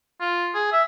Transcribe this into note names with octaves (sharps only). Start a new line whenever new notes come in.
F4
G#4
E5